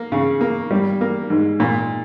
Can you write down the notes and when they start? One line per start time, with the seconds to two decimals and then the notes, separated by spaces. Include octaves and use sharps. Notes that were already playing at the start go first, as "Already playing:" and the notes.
Already playing: A#3
0.12 C#3
0.41 A#3
0.71 G3
1.01 A#3
1.30 G#2
1.60 A#2